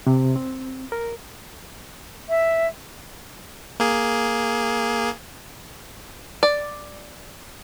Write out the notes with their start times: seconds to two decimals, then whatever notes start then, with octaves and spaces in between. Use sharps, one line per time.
0.07 C3
0.36 C4
0.92 A#4
2.29 E5
3.80 A#3 G#4
6.43 D5